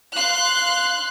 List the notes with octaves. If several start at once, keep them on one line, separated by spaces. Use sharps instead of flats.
F5 C6 F#6